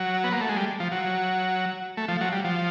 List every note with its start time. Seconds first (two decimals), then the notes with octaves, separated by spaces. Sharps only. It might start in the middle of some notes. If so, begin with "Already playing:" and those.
Already playing: F#3
0.24 B3
0.32 A#3
0.41 A3
0.49 G#3
0.57 G3
0.80 F3
0.92 F#3
1.97 A3
2.08 F3
2.21 F#3
2.32 G3
2.44 F3